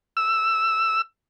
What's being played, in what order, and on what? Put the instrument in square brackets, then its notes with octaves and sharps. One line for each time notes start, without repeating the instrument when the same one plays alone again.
[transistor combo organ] E6